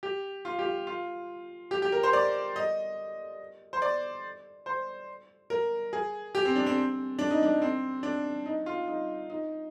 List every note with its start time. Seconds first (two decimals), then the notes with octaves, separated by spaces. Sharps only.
0.03 G4
0.45 F4
0.59 G4
0.66 F4
0.87 F4
1.71 G4
1.82 G4
1.92 A#4
2.03 C5
2.13 D5
2.56 D#5
3.73 C5
3.82 D5
4.66 C5
5.50 A#4
5.93 G#4
6.35 G4
6.45 C4
6.56 D4
6.66 C4
7.19 D4
7.31 D#4
7.43 D4
7.62 C4
8.03 D4
8.46 D#4
8.66 F4
8.88 D#4
9.30 D#4